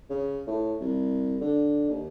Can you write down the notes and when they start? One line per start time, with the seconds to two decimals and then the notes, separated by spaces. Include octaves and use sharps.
0.10 C#3
0.47 A2
0.81 C2
1.41 D3
1.90 D#2